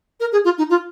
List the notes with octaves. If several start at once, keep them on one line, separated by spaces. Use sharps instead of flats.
A#4
G#4
F4
D#4
F4